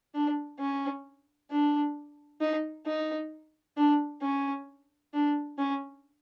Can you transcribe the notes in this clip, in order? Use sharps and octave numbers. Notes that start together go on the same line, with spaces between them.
D4
C#4
D4
D#4
D#4
D4
C#4
D4
C#4